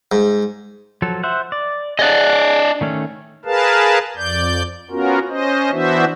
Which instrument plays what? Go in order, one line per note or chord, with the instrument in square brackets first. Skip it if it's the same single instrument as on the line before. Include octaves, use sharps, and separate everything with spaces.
[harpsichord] G#2
[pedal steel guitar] F3 F#3 A4
C5 E5 F#5
D5
[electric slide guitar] D4 D5 D#5 [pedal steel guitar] G#4 F#5
[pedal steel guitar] D#3 A3 C#4
[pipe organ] G#4 A#4 B4 F5 A5
F2 D5 G6
B3 C#4 F4 F#4 A#4
C#4 C5 D#5
E3 B3 D4 F#4 C5 E5